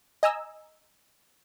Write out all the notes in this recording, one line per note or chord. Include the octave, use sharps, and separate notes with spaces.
D#5 G#5 A#5 E6